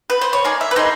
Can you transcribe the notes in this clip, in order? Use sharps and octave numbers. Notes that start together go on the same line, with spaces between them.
B4
C5
C#5
A#3 D#4 G#4 D5
E5
B4
A#3 D#4 G#4 C5